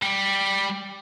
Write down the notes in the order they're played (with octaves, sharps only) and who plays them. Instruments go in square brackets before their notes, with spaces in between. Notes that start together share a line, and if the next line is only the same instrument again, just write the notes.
[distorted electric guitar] G3